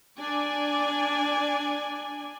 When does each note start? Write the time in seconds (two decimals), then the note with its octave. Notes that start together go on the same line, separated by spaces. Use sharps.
0.19 D4 D5 G#5